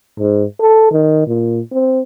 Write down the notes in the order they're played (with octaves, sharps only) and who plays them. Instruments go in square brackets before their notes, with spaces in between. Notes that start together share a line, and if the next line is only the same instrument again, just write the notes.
[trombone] G#2
A4
D#3
A#2
C4